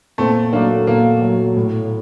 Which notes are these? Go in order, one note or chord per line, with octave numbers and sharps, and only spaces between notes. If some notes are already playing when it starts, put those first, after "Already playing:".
A#2 A3 C4
F#3 A3 A#3 D4
A#2 A#3
F#3 A3
A2